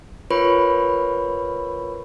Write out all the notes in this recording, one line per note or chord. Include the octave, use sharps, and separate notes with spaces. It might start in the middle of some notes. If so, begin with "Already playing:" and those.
F4 A#4 B4 C#5 B5 C#6